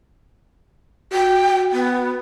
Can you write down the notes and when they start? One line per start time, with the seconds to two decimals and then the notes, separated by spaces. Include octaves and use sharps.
1.13 F#4 G5
1.72 B3